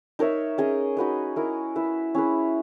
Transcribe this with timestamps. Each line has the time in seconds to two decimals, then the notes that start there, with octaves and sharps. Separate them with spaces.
0.19 D#4 A#4 C#5 E5
0.58 C#4 G#4 D#5
0.97 D#4 F#4 B4 D#5
1.36 E4 A#4 D#5
1.76 E4 B4 E5
2.14 C#4 E4 G#4 B4